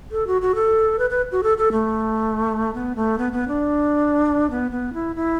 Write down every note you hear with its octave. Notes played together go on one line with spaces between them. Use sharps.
A4
F#4
F#4
A4
B4
B4
F#4
A4
A4
A3
B3
A3
B3
B3
D4
B3
B3
E4
E4